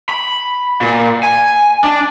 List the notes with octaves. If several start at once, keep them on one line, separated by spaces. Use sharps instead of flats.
B5
A#2
G#5
D4